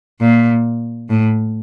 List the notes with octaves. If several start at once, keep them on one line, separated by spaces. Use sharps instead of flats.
A#2
A2